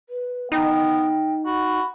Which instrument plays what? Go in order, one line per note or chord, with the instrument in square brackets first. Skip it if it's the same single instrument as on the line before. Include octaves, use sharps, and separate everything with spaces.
[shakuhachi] B4
[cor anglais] B3 [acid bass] D#4 [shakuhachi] G5
[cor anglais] F#4 [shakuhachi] B5